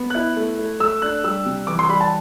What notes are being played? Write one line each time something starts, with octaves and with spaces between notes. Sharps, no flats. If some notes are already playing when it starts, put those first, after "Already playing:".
Already playing: B3
E4 F#6
A3
A3
A3 E6
D4 F#6
G3 E6
C3
E3 D6
C6
G3 B5
A5